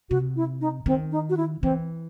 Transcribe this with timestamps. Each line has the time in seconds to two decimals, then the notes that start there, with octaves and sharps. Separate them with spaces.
0.10 C3 F#4
0.36 E4
0.61 D#4
0.86 D#3 C4
1.12 D#4
1.30 F#4
1.37 E4
1.62 E3 C4